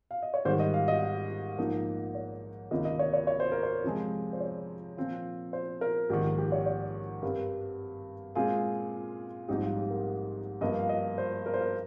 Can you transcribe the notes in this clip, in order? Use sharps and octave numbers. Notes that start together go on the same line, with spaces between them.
F5
D#5
C#5
G#2 D#3 G3 C5
D#5
F5
D#5
A#1 G#2 F3 A#3 D#4
C#5
C#2 C3 D#3 A#3 D#5
D#5
C#5
C#5
C#5
C5
A#4
C5
F2 C3 F3 G#3
C5
C#5
A#2 F3 C4 F4
C5
A#4
A#1 G#2 D#3 G4
G4
C#5
C#5
G2 G3 C4 A#4
A#2 G#3 C4 F4 G#4
A#1 G#2 G3 C4 D#4 G4
F4
G4
A#4
G2 F3 A#3 D#5
F5
D#5
C5
A#4
C5
A#4